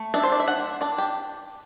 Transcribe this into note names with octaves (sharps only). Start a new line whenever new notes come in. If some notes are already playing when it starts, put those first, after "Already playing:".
Already playing: A3
D4 E5
C5
D5
E5
D4 F#5
D4 D5
G4